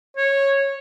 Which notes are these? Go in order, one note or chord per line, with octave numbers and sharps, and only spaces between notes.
C#5